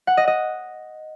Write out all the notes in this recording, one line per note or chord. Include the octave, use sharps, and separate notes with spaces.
F#5
D#5
D#5